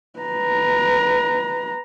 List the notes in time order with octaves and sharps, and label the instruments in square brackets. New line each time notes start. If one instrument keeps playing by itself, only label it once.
[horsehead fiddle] B4 A#5